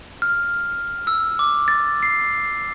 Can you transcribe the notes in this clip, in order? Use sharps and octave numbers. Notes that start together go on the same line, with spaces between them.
F6
E6
D6
A6
C7